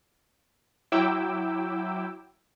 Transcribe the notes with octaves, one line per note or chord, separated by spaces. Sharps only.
F#3 E4 G5 D6 E6